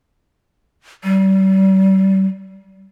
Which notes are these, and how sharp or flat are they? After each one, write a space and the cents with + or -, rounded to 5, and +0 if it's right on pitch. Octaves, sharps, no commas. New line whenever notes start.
G3 -35